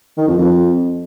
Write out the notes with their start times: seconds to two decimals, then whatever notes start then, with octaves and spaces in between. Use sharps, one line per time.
0.17 D#3
0.28 F2
0.38 F2